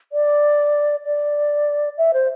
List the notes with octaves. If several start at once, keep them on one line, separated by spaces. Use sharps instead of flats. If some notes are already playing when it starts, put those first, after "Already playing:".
D5
D5
E5
C5